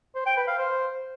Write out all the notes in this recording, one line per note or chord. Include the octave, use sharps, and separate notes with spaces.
C5
G5
B4
F5
C5